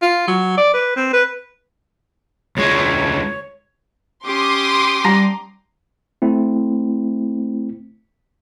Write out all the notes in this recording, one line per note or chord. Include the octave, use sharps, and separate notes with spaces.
F4
F#3
D5
B4
C4
B4
D2 G#3 C#5
C#4 G4 C6 D6 D#6
G3 A#5
A3 C4 E4